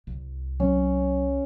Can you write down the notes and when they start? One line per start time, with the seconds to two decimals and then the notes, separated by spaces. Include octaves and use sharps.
0.07 C2
0.60 F#3 C4 C#4